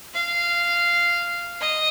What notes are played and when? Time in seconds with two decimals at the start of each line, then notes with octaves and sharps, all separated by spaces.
0.14 F5
1.61 D#5